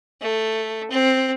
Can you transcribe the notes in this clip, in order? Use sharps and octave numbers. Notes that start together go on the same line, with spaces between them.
A3
C4